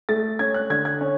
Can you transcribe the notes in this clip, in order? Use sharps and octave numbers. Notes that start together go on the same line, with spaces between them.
A3 A6
C#4 G#6
F#6
D3 G#6
G#6
C#4